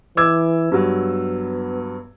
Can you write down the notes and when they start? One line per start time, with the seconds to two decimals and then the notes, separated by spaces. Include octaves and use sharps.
0.17 E3 D6 E6 G#6
0.72 G2 F#3 B3